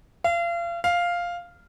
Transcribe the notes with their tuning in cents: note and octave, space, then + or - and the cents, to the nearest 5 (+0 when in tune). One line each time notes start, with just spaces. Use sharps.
F5 -35
F5 +0